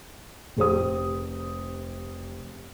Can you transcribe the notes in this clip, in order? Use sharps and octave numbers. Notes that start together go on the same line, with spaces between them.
F1 G4 C5 D#6